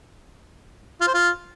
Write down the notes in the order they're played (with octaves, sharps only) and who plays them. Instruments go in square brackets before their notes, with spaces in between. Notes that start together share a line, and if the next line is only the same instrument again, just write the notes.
[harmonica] F4
C5
F4